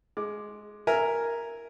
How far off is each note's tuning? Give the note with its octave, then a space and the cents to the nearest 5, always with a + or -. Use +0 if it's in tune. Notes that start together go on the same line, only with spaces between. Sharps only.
G#3 +10 D6 +10
A#4 +0 E5 +0 G#5 +0